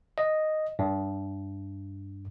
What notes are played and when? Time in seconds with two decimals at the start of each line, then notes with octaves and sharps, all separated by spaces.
0.18 D#5
0.79 G2